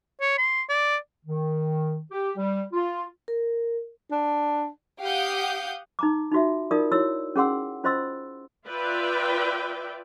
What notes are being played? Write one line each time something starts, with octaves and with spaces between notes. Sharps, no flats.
C#5
C6
D5
D#3
G4
G3
F4
A#4
D4
G4 F5 F#5 D#6 G6
D#4 A#5 D6
D#4 F4 F#4 E5
D#4 F4 A#4 D5 D#6
E4 F#4 C#5 E6
C#4 G#4 F#5 C6 E6
C#4 F4 C5 D#5 C6 E6
F4 B4 D5 E5 G5